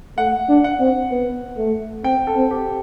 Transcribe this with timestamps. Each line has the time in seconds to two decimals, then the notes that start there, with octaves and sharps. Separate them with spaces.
0.17 A3 F#5
0.49 D4
0.64 F#5
0.80 C4
1.11 B3
1.57 A3
2.04 C4 G5
2.27 A4
2.35 C4
2.51 G4